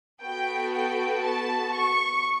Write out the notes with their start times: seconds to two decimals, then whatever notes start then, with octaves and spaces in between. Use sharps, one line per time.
0.23 B3 F#4 A4 G5
0.74 G5
1.23 A5
1.73 C#6